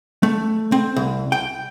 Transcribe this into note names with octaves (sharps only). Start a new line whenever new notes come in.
A3
C4
C2
G5